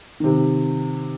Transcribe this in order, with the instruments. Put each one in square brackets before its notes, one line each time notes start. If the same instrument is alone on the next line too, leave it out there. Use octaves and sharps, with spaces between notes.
[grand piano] C3 D#3